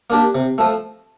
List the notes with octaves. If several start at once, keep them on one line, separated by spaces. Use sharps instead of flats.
A#3 D4 G4
C3
F3 A3